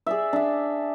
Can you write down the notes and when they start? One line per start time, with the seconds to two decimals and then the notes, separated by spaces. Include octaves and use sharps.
0.06 G#4 D5 E5
0.33 D4 E5